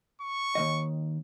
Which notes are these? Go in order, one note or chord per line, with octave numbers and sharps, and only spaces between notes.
C#6
D#2 C#3 D#5